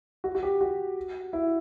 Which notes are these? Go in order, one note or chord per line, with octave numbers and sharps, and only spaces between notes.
F#4
F#4
G4
F#4
E4